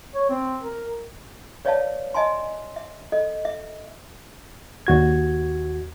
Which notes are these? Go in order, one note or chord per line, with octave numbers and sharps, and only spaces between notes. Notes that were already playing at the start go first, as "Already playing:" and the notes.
C#5
C4
A#4
B4 C#5 D5 E5 F5 A5
D#5 E5 G#5 A5 C6
E5
A4 D#5
E5
D#2 F#4 G#6